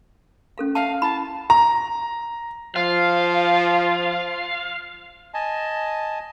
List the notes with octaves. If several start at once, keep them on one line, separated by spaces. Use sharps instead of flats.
C#4 A4 F5
E5 F5 G5 A5
E4 F#5 A5 B5
A#5
F3 F4 F5
D#5 G#5 A5